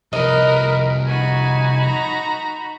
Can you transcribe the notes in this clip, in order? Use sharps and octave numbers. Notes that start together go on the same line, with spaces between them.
C2 F3 A#4 B4 D#5
D#4 F#4 G#5 B5
A#5